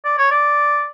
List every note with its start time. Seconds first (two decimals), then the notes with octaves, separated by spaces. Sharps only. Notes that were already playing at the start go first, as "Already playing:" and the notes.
0.05 D5
0.18 C#5
0.31 D5